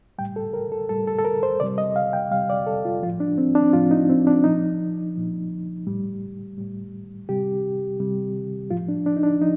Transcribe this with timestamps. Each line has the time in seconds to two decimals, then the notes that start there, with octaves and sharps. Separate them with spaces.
0.18 A2 G3 G5
0.36 A4
0.53 A#4
0.72 A4
0.89 A2 G3 A4
1.07 A4
1.18 A4
1.25 A#4
1.43 C5
1.60 C3 G3 D5
1.78 D#5
1.96 F5
2.13 G5
2.31 C3 G3 F5
2.50 D5
2.67 A4
2.85 F4
3.03 F3 F4
3.07 A2
3.20 D4
3.38 C4
3.55 D4
3.73 A2 F3 F4
3.91 D#4
4.09 C4
4.27 D4
4.44 A#2 F3 D#4
5.16 A#2 F3
5.87 A2 G3
6.58 A2 G3
7.29 C3 G3 G4
8.00 C3 G3
8.71 A2 F3 F4
8.88 D4
9.06 D4
9.17 D#4
9.23 D4
9.41 F3 D#4